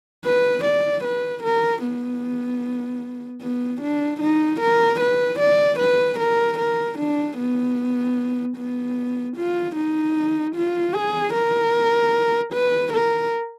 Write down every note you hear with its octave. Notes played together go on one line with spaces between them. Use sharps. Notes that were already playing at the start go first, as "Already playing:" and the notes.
B4
D5
B4
A#4
B3
B3
D4
D#4
A#4
B4
D5
B4
A#4
A#4
D4
B3
B3
F4
D#4
F4
G#4
A#4
B4
A#4